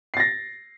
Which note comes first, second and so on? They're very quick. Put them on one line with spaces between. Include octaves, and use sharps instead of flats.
C7 A6 A#6